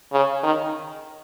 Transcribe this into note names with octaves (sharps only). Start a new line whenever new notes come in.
C#3
D#3